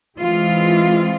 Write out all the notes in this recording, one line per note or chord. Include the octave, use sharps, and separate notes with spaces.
E3 G#3 C4 F4